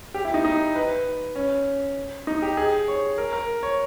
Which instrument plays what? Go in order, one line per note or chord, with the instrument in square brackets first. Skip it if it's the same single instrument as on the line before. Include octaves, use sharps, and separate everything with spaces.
[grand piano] G4
E4
D#4
D#4
B4
C#4
D#4
G4
G#4
C#5
A#4
A#4
C#5